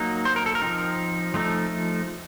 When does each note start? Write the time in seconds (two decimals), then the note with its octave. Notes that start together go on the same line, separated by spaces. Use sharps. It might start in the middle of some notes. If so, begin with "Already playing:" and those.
Already playing: F#3 A#3 D#4
0.25 C5
0.36 A#4
0.46 A4
0.55 A#4
0.62 F3 C4 D#4
1.34 F3 A3 D#4